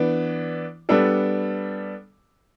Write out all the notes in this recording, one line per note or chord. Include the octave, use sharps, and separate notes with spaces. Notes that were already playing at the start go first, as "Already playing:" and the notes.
Already playing: E3 B3 D4
G3 B3 D4 A4